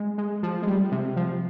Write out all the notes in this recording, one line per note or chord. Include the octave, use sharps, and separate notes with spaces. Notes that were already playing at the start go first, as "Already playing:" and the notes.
Already playing: G#3
G#3
F3
G#3
G3
C3
F3